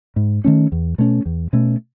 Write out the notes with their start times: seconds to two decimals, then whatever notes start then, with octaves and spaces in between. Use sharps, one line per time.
0.16 G#2
0.44 D#3 A3 C#4
0.72 E2
0.98 B2 A3 C#4
1.26 E2
1.53 B2 A3 C#4